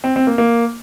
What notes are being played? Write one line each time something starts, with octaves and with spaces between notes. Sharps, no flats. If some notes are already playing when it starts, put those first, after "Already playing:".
C4
C4
A#3
A#3